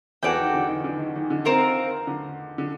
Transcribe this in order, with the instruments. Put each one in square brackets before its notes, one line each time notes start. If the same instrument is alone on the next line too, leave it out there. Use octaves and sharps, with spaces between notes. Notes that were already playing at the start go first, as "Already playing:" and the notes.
[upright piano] E2 E3 [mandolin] F#4 A4 D5 G5
[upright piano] D#3
D3
D#3
D#3
D3
D#3
D#3
D3
[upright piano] D#3 [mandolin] C4 F4 A#4
[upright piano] D3
D3